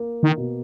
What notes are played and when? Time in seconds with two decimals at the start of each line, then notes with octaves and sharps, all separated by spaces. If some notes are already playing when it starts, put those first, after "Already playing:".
Already playing: A#3
0.23 D#3
0.37 B2